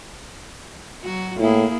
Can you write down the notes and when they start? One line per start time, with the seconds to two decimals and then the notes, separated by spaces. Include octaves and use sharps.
1.04 F#3 F#4
1.38 A2 A#3 E4 G#4